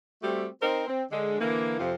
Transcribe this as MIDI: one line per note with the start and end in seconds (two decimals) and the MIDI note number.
0.22 0.46 55
0.22 0.46 57
0.22 0.46 60
0.22 0.46 66
0.22 0.46 67
0.61 0.86 60
0.61 0.86 63
0.61 0.86 70
0.61 0.86 72
0.87 1.02 60
1.11 1.39 50
1.11 1.39 56
1.40 1.77 50
1.40 1.77 52
1.40 1.77 58
1.79 1.95 41
1.79 1.95 48
1.79 1.95 53
1.79 1.95 65